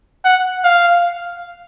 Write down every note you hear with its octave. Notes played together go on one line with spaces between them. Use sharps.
F#5
F5